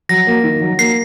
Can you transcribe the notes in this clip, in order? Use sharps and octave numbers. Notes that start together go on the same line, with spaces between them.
F#3 A#6
A#3
D#3
F#3
A#3 C7